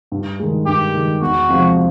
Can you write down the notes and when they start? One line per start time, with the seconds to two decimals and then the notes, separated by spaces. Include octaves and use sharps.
0.12 G2
0.39 D#3 G#3
0.66 G2 G4
0.94 D#3 G#3
1.21 E2 F#4
1.49 C3 F3 G#3